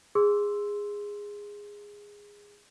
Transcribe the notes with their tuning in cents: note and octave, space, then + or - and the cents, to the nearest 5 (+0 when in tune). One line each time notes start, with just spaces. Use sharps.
G#4 -15 C6 +0 E6 +0